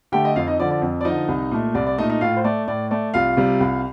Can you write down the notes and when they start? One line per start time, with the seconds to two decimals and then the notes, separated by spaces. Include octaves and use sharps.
0.12 D3 A3 G4 G5
0.25 D#5
0.36 F2 F4 F5
0.47 D#4 D#5
0.60 D3 F3 D5
0.71 D5
0.82 F2
1.01 D5
1.05 D3 F3 D#4 D#5
1.28 C2
1.51 A#2 A3
1.74 C2 D5
1.87 D5
1.98 A#2 A3 D#4 D#5
2.09 D#4 D#5
2.21 A2 F4 F5
2.37 C5
2.44 A3 D5
2.68 A2 D5
2.91 A3 D5
3.14 C2 F4 F5
3.37 C3 G3
3.60 C2